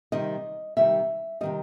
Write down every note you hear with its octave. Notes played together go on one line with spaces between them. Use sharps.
C3 D#3 G3 D#5
C3 D#3 G3 E5
C3 D#3 G3 D#5